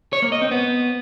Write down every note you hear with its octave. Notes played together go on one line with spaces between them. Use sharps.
C#5
A#3
D#5
C4
B3